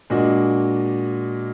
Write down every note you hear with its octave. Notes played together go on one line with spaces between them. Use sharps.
A#2 G#3 D4 F#4